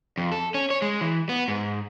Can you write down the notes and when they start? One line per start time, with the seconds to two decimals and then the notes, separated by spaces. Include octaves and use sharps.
0.18 F2
0.32 A4
0.54 C#4
0.70 C#5
0.82 G#3
1.01 E3
1.29 B3
1.48 G#2